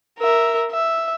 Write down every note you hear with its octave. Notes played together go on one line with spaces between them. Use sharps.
A#4 E5
E5